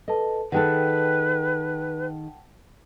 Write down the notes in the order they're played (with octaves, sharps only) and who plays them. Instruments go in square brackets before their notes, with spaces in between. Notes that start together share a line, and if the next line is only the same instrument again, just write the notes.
[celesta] A4 B4 A5 [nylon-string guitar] D#5
[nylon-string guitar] D#3 G#4 A4 [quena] B4 [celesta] F#5 G5 A5